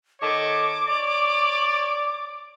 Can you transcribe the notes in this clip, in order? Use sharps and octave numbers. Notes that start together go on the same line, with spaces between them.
D#3 A4 C#5 D6
C#5 D5